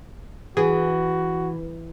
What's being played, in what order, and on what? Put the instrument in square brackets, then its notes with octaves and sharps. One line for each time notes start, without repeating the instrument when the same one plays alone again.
[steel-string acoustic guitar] E3 [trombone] F#4 [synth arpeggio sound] G#4